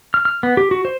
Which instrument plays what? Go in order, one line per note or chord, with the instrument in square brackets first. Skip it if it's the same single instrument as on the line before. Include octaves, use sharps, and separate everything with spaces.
[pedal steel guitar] F6
F6
B3
G4
F#4
C5